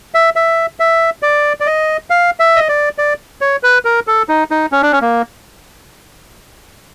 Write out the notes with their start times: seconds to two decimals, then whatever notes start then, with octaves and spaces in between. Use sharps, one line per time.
0.14 E5
0.36 E5
0.80 E5
1.22 D5
1.60 D5
1.67 D#5
2.10 F5
2.39 E5
2.56 D#5
2.69 D5
2.98 D5
3.41 C#5
3.63 B4
3.85 A#4
4.07 A4
4.29 D#4
4.51 D#4
4.72 C#4
4.83 D4
4.92 C#4
5.02 A#3